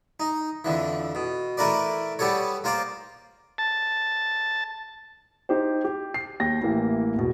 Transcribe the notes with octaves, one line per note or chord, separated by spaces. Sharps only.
D#4
F2 D3 E3
B2
E3 A3 E4 A#4 B4 D5
G3 B3 G4 A4 C#5
A#3 F4 C5 D5
A5
D#4 G4 C5
G4
C7
D#2 G5 A#6
A1 E3 A#3
E1 B2